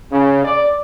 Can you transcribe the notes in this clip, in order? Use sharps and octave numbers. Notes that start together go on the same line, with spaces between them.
C#3
D5